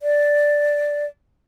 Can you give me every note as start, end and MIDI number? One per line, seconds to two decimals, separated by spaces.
0.01 1.06 74